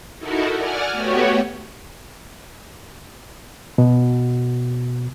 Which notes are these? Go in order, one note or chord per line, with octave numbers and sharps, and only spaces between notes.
D#4 E4 F#4 A4 A#4
D5 F#5 G#5 F6
A3 B3 F#4 G4 C#5
B2